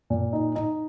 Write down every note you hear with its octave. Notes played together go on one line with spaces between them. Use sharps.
A#2
D#4
D#4